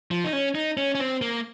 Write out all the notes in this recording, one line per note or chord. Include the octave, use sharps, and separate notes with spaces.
F3
D#4
C#4
D#4
C#4
C#4
C4
A#3